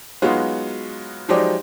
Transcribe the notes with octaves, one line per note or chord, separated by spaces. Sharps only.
F#3 G#3 B3 D#4 F4 F#4
F3 F#3 G#3 D#4 G4 D5